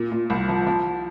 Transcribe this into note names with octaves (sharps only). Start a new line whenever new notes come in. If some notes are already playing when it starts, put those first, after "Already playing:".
Already playing: A#2
A#2
C2
F3
F3